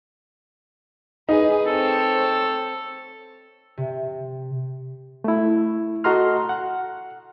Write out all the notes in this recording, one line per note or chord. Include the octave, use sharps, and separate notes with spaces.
D#4 G#4 B4
C4 A4 C5 C#5
C3
A3 E4
F#4 A4 D#5 A#5 C6 F6
F#5